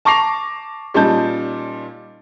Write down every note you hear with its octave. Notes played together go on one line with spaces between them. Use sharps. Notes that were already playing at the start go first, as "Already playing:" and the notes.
A5 C#6 D6 A#6 C7 F7
A#2 G3 C#4 D#4 A5 G6